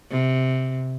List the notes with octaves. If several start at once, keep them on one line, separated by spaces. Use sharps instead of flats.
C3